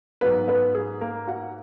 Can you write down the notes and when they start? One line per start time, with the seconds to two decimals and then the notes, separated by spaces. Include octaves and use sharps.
0.21 G#2 F#3 B3 B4
0.48 B3 B4
0.75 G#4
1.01 A#3 A#4
1.27 F#4 F#5